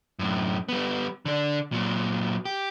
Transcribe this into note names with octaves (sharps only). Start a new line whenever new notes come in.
F#2 A2
G3 B3
D3 D4
A#2 F#3
G4